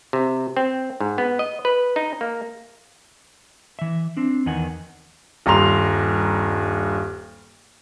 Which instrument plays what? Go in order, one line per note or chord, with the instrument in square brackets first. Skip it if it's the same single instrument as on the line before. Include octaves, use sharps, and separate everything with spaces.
[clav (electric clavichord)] C3
C4
G#2
B3
D#5
B4
D#4
A#3
[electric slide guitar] E3 E5
C4 D4
E2 D#3 D#5 F#5 G#5
[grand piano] D#1 G2 A#5 C6 F7